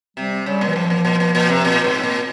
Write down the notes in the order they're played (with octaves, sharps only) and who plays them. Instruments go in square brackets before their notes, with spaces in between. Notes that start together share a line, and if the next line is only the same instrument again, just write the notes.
[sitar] C3 [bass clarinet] G3
[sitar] C#3 [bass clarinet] G3
[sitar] A#2
[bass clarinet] E3
[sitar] G#2 [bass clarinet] F3
[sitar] A#2
A#2
A#2
A#2
C3
A#2
G#2
A#2